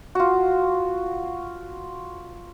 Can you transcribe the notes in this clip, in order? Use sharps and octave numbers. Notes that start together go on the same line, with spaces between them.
F4 F#4